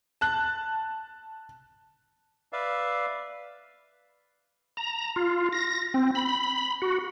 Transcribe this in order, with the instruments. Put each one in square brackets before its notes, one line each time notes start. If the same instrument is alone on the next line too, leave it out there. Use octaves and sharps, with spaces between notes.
[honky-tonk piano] A5 F#6
[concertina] B4 D5 E5 F5
[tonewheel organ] A#5
F4
A#6
C4
B5
F#4